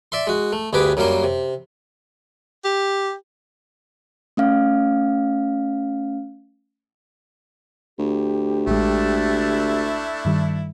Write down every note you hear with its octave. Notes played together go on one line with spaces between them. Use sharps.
D5 E5 C6
G#3 F#4
A3
D2 G2 G4 G#4 B4 D6
F#2 F#3 G3 A#3 A#4 C6
C3
G4
A3 C#4 F5
D2 G4
A1 G#3 A3 D4 E4
G2 D#3 G3